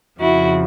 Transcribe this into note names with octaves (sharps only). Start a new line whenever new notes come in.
F2 C#3 F3 E4 F#4